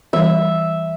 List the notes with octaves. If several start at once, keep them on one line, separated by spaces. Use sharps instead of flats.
E3 G3 E5